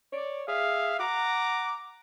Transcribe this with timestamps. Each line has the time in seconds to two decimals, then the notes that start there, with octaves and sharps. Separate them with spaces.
0.13 C#5 D5
0.48 G#4 E5 F5
0.99 F#5 A#5 D6